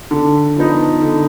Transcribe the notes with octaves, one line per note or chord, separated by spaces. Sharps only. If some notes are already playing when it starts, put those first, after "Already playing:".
D3
F3 B3 D#4
D3